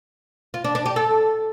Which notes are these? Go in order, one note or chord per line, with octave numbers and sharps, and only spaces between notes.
F4
D4
D4
G4
A4